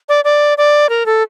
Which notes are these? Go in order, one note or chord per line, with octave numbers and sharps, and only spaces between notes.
D5
D5
D5
A#4
A4